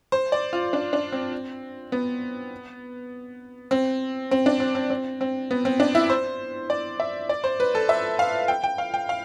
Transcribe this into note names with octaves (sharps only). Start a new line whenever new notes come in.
C5
D5
F4
D4
D4
C4
B3
C4
C4
D4
C4
C4
C4
C4
B3
C4
D4
E4
C5
D5
E5
D5
C5
B4
A4
E5
F5
G5
G5
F5
G5
F5